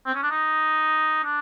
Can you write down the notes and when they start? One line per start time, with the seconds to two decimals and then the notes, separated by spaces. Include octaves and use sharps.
0.06 C4
0.15 C#4
0.23 D4
0.31 D#4
1.24 D4